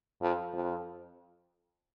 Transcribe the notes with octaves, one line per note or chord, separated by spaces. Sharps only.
F2
F2